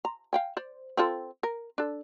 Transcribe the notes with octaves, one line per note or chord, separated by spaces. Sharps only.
A#5
F5 G5 G#5
C5 D5
C4 F4 A4
A#4
D4 A4